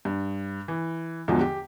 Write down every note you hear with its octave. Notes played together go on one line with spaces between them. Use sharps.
G2
E3
E2 G#2 D3 F3 F#3
G4